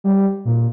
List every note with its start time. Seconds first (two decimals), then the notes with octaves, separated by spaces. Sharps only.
0.04 G3
0.45 A#2